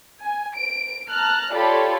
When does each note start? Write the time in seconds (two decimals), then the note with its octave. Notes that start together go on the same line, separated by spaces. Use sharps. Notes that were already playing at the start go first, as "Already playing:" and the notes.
0.23 G#5
0.56 D7
1.10 A5 A#5 F6 F#6
1.52 F4 G4 A4 C#5 D5 B5